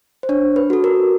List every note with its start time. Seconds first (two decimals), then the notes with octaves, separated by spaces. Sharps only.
0.23 C5
0.29 D4 C#5
0.56 B4
0.70 F#4 A4
0.84 A#4